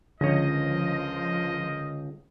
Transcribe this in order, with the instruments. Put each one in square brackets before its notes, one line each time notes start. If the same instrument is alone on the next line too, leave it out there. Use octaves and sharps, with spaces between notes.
[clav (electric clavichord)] C#2 C#5 [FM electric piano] D3 [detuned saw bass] F3 [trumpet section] A#4 C5 D#5